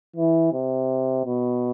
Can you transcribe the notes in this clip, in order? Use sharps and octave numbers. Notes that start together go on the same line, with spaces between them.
E3
C3
B2